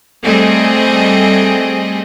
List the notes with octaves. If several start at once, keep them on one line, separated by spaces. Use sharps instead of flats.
G3 A3 C4 G#4 D#5